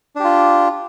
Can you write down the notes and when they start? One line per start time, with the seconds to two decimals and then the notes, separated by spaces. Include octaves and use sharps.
0.16 D4
0.20 G4
0.24 F4